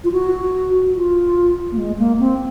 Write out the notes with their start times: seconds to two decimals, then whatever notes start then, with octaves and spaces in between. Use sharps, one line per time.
0.04 F4
0.12 F#4
0.95 F4
1.72 A#3
1.77 G#3
1.99 A#3
2.20 C4